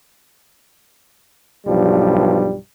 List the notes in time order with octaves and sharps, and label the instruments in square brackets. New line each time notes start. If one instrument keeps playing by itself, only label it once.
[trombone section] B1 G2 F3 G3